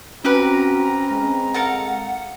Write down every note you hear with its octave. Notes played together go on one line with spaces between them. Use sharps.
C4 C#4 E4 F#4 G4 B4 C5 A#5
G#3
A4 A#4 F5 F#5